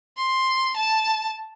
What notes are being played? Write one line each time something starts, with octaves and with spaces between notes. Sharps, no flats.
C6
A5